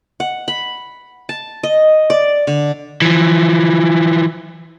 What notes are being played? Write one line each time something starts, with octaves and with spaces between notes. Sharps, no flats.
F#5
B5
A5
D#5
D5
D3
E3 F3